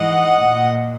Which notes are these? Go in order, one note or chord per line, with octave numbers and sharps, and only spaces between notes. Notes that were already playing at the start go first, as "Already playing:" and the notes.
Already playing: G#2 E3 D#5 F#5
A#2